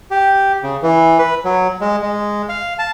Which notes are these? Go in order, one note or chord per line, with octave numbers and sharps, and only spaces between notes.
G4
C#3
E3
B4
F#3
G#3
G#3
F5
A5